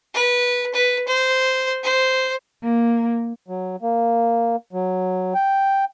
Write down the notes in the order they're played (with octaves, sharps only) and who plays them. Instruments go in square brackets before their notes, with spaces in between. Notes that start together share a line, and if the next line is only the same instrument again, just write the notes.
[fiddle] B4
B4
C5
C5
[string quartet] A#3
[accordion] F#3
A#3
F#3
G5